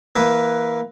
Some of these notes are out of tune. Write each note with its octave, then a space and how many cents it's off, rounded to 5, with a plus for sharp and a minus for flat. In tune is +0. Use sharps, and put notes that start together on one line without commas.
E3 +0 A#3 +15 B4 +0